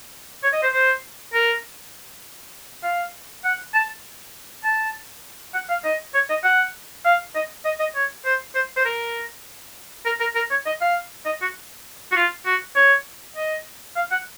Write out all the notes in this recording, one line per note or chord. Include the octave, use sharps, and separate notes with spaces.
C#5
D#5
C5
C5
A#4
F5
F#5
A5
A5
F#5
F5
D#5
C#5
D#5
F#5
F5
D#5
D#5
D#5
C#5
C5
C5
C5
A#4
A#4
A#4
A#4
C#5
D#5
F5
D#5
F#4
F#4
F4
F#4
C#5
D#5
F5
F#5